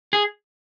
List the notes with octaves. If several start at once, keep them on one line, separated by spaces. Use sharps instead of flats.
G#4